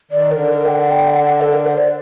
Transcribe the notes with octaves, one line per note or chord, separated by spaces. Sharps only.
D#3 D5
D3 A#4
A#4
G5
F#5
G5
F#5
A4
A#4
C5
D5